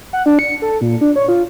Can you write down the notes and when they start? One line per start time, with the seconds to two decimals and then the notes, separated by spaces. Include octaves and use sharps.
0.13 F#5
0.26 D4
0.39 C#7
0.62 A4
0.81 A#2
1.01 D4
1.16 C#5
1.28 F4